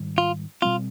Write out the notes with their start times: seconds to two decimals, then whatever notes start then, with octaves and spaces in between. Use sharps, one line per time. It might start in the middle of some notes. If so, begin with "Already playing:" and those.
Already playing: G#2 D#3 G3
0.18 F4
0.62 B2 G3 C4 F4